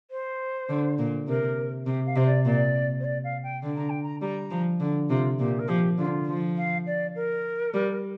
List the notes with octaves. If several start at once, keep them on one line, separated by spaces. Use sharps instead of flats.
C5
D3
A#2
C3 A#4
C3 G4
F5
C3 C5
D5
A#2 D5
C5
D5
F5
G5
D3
A#5
G5
A#5
G3 A#5
F3
D3
C3 F4
A#2 G4
A#4
F3 G4
D3 F4
F3
F5
D5
A#4
G3